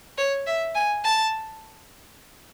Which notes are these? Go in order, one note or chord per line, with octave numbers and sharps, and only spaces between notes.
C#5
E5
G#5
A5